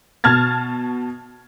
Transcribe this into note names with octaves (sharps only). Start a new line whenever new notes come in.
B2 A5 F6 G#6 A6